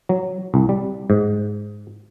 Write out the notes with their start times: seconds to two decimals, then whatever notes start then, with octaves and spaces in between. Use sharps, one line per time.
0.09 F#3
0.54 C2
0.69 G3
1.10 G#2